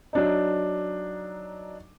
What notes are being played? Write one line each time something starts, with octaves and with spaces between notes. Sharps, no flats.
F#3 D4 D#4